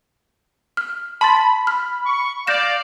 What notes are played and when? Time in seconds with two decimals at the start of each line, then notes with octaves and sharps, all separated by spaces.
0.77 F6
1.21 A5 B5 C6 A6
1.67 F6
2.06 C#6
2.47 D5 F5 G6 A#6 E7